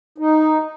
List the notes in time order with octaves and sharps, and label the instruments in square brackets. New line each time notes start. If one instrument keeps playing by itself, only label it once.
[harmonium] D#4